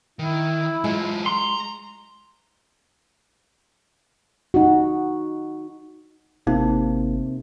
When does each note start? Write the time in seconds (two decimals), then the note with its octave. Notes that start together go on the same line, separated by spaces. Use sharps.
0.19 D#3 E4
0.84 F#3 G#3 F4
1.26 A#5 C6
4.54 D#4 F#4
6.47 G#1 C3 A#3 D#4